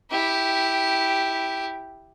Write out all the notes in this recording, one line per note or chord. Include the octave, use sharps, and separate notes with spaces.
E4 G4